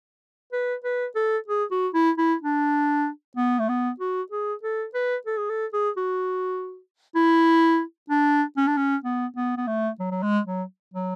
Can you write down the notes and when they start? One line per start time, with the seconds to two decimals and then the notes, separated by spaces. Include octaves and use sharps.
0.53 B4
0.84 B4
1.16 A4
1.48 G#4
1.71 F#4
1.94 E4
2.18 E4
2.42 D4
3.37 B3
3.59 A3
3.69 B3
4.00 F#4
4.32 G#4
4.63 A4
4.94 B4
5.27 A4
5.38 G#4
5.50 A4
5.73 G#4
5.97 F#4
7.15 E4
8.10 D4
8.57 C#4
8.67 D4
8.77 C#4
9.05 B3
9.36 B3
9.57 B3
9.67 A3
9.99 F#3
10.11 F#3
10.23 G#3
10.46 F#3
10.94 F#3